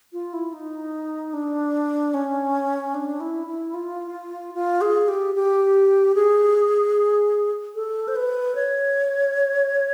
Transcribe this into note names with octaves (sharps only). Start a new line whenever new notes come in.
F4
E4
D#4
D4
C#4
D4
E4
E4
F4
F4
G#4
G4
G4
G#4
A4
C5
B4
C#5